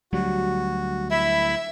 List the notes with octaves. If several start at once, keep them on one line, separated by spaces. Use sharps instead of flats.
D2 F#3 G3 F#4
E4 E5 B5